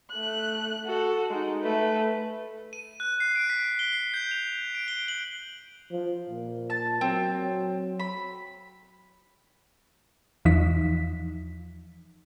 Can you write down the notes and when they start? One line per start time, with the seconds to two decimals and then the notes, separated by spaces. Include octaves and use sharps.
0.11 A3 F#6
0.86 F#4 A4
1.31 G#3 D#4
1.62 A3 B4
2.73 D#7
3.00 F#6
3.20 C7
3.36 D7
3.50 B6
3.79 G7
3.92 C7
4.14 G6
4.31 F7
4.75 D7
4.88 G7
5.08 F#7
5.92 F3
6.29 A#2
6.70 A5
7.01 F#3 C4
8.00 B5
10.45 E2 E3 F3 D#4 B6